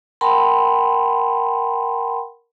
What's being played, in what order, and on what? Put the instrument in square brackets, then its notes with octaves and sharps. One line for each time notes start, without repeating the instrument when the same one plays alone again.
[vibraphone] A#4 F#5 G5 A5 B5 C6